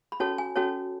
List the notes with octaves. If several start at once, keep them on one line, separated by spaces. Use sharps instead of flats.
B5
C#4 F#4 A4 C#5 A5
G#5
C#4 F#4 A4 C#5 A5